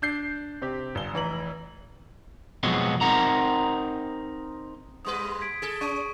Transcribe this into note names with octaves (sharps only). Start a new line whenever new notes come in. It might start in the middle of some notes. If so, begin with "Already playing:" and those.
D4 G6 C7
C3 C4 G4
G1 G7
F1 E3 A#5 F#7
F2 B2 F3 F#3 G#3 B3
C4 D#4 A#4 F#5 A#5
G#2 G3 B4 D#6
G#6 B6 D7
G#4 A4
C#4 C#6 D#7